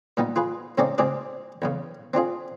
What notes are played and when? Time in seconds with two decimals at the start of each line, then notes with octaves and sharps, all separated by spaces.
0.17 A#2 G3 B3 D#4
0.36 F4 G#4 B4
0.78 G#2 C#3 C4 C#4 D#4 D5
0.98 C#2 G#2 C4 G4 G#4 D5
1.62 E2 G2 C#3
2.14 C4 D4 F4 G#4